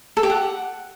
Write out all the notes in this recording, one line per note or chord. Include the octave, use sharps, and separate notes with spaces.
A4
G4
F#5